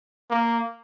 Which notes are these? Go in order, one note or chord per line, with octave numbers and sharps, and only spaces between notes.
A#3